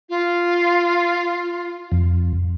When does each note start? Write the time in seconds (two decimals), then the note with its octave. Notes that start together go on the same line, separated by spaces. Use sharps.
0.10 F4
1.92 F2